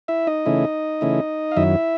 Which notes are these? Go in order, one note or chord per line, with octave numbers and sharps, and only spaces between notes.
E4 E5
D#4 D#5
C#3 E3 A3 C#4 E4
C#3 E3 A3 C#4 E4
F5
F#2 D#3 F#3 E4 E5